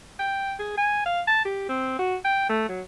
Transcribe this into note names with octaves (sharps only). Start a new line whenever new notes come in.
G5
G#4
G#5
F5
A5
G4
C4
F#4
G5
A3
F#3